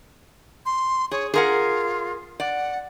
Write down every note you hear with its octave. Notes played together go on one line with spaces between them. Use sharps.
C6
G#4 C#5
F4 G#4 A#4 F#5
D5 F#5